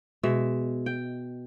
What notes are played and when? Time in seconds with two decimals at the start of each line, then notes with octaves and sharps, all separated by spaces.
0.23 B2 G#3 E5
0.86 G5